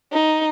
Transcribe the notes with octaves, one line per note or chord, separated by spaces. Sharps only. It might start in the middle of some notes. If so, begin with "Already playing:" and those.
D#4